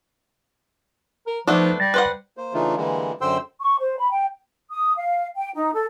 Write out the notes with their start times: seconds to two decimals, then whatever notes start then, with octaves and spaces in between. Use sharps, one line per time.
1.27 A#4
1.48 F3 A3 B3 D4 D#4
1.80 G3 A6 A#6
1.94 B4 C5 F#5
2.37 A#3 C5
2.54 C#3 E3 A3 D4 D#4 F4
2.77 D3 E3 G3 G#3 A#3
3.21 F#2 D3 C5 G5 C6 E6
3.61 C#6
3.80 C5
3.98 B5
4.11 G5
4.71 D#6
4.97 F5
5.36 G5
5.55 D#4
5.73 A4